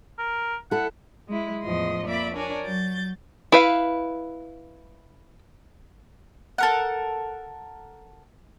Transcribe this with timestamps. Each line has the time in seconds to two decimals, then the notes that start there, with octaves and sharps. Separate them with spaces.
0.18 A#4
0.71 E4 A4 F#5
1.28 G#3 E4
1.63 E2 A2 F3 D#5 C6
2.05 F2 A#3 D5 E5 B5 D6
2.34 D4 A#4 C#5 D5 G#5
2.65 F#3 G6 A6
3.52 E4 B4 F5
6.58 A4 A#4 F#5